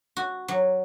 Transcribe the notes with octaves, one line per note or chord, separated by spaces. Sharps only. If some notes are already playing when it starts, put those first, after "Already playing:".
F#4
F#3